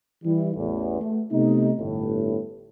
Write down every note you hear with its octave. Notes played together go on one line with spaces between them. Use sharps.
E3 G3 E4
A1 E2
A3
C3 A3 B3 D#4
G1 A2